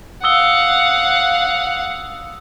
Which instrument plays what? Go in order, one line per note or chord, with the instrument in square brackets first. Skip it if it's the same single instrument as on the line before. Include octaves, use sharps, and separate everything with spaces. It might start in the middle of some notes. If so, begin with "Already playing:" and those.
[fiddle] F5 F#5 [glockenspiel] D#6 E6 G7